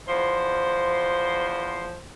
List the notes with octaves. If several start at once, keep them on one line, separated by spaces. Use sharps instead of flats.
E2 F3 C5